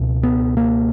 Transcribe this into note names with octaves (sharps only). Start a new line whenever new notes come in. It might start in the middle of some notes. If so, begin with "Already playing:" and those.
Already playing: C#2 B2
B3
A#3